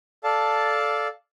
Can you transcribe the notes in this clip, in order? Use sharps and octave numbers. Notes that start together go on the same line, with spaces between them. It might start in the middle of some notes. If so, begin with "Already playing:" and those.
A4 D5 F5 A5